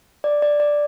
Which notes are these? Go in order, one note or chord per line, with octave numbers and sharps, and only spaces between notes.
D5
D5
D5